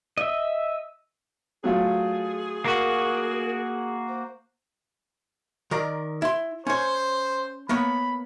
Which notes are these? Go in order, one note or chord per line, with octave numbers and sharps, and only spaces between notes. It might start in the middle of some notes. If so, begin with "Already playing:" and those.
D#5 E5
F#3 A3 F4 G#4
A#3 F#4 A#4
C5
D#3 A#4 D5
E4 C6
C#4 C5 C#5
A#3 B3 C#5 B5